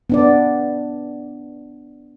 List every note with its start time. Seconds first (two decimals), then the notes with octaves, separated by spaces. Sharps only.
0.10 B3 D4 D5